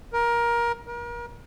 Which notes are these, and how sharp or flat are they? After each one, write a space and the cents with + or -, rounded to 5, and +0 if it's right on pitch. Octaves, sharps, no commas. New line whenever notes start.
A#4 +20
A#4 +35